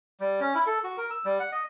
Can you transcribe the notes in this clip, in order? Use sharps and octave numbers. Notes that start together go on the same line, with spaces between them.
G3
C#4
E4
A4
F#4
A#4
E6
G3
F#5
D#5